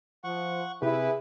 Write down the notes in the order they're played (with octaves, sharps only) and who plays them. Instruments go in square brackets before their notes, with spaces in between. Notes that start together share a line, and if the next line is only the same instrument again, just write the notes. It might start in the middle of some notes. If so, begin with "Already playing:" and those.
[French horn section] F3 [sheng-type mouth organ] F#5 C#6
[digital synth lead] C3 [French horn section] E4 G#4 [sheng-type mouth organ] B4